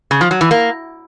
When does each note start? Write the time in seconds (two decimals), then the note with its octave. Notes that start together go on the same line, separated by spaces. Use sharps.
0.11 C#3
0.21 F3
0.31 F#3
0.41 E3
0.51 A#3